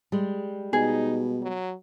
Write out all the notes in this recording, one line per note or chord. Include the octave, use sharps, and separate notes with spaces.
G3 G#3
B2 D#4 G#4
F#3